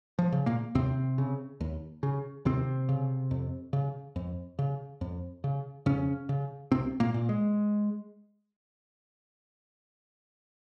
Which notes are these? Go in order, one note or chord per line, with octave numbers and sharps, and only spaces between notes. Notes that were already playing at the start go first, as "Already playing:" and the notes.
F3
C#3
A#2 A#3
D#2 C3 C4
C#3
D#2
C#3
D#2 C3 C4
C#3
F2
C#3
F2
C#3
F2
C#3
F2 C#3 C#4
C#3
C2 C3 C4
A#2 A#3
A#2
G#3